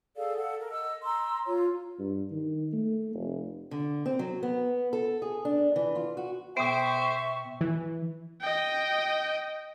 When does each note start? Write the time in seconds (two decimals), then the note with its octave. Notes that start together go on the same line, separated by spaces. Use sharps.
0.16 G#4 A4 D5 F5
0.37 A4 F#5
0.59 A#4
0.71 D#5 E6
1.04 A#5 C6 E6
1.46 F4 C#5
1.99 G2
2.31 D#3
2.73 A3
3.15 F1
3.71 D3
4.06 C4
4.19 F#3
4.43 B3
4.93 A4
5.22 G#4
5.45 D4
5.76 E3
5.95 F4
6.17 F#4
6.57 B2 B3 C5 E5 G5 C#6
7.61 E3
8.41 D#5 G5